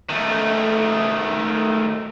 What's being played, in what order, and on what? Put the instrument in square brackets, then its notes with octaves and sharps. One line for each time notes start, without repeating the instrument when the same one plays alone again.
[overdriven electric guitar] D#3 A3